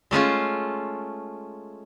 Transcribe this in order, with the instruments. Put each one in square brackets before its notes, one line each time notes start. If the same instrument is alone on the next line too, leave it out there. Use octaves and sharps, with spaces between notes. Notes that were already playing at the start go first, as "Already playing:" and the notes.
[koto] G#3 A3 C#4 F4